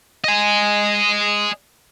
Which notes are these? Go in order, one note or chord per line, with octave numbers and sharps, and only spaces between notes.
D#5 G#5